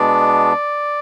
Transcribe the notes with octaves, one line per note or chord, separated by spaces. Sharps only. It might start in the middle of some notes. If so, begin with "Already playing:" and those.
Already playing: B2 G#3 B3 D4 D5